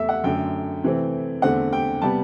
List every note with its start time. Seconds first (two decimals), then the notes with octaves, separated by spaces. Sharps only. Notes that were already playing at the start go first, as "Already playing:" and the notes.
Already playing: E2 A3 E5
0.09 F#5
0.24 F#2 D3 A3 G5
0.83 C3 E3 A3 C4
1.42 E2 D3 A3 C4 F#5
1.73 G5
2.02 C3 G3 B3 A5